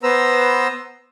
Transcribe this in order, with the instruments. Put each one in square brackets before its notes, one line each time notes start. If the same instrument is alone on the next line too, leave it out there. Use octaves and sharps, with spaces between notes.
[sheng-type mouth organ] B3 B4 C5 A#5 E6